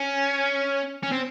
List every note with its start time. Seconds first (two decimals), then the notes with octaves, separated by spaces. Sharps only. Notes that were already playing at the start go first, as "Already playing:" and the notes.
Already playing: C#4
1.03 C#4
1.11 C4